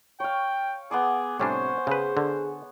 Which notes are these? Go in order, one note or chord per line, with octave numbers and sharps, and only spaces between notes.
C#5 F5 G5
B3 G#4 C6 D6
A2 C3 G3 D4 C5 C#5 G#5
C#3 G#4 B4
D3